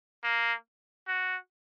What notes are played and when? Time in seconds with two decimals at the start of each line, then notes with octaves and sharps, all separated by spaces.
0.24 A#3
1.08 F#4